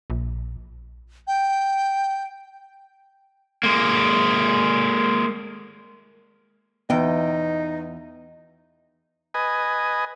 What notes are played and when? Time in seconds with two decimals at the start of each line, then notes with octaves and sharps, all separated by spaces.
0.10 A#1
1.27 G5
3.63 G#3 A#3
6.90 E2 B3 D#4 G5
9.34 B4 D#5 G#5